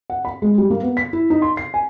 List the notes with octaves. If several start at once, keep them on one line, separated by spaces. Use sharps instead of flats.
F#5
B5
G#3
G3
A#3
B3
B6
E4
D#4
C6
C7
G#5